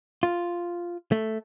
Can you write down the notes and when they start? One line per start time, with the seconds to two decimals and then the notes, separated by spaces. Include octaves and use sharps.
0.23 F4
1.12 A3